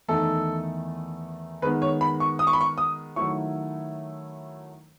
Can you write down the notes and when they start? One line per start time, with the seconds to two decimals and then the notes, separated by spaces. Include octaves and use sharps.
0.08 E2 D#3 A3 D#4 A4
1.62 D#3 G#3 B3 B4
1.82 C#5
2.01 B5
2.20 C#6
2.39 D#6
2.47 C#6
2.53 B5
2.61 C#6
2.78 D#6
3.16 D#3 F#3 A3 E4 C#6